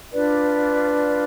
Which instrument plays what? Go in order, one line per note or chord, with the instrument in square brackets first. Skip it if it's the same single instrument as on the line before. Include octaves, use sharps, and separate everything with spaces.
[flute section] D4 F4 B4 D5